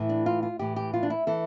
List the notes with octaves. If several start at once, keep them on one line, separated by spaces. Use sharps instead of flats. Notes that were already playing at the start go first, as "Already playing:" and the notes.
Already playing: A2 E3
D4
F4
F4
A2 E3 G4
G4
F4
D4
E4
E3 A4